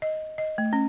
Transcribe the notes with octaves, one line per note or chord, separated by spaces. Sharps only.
D#5
D#5
A3
C#4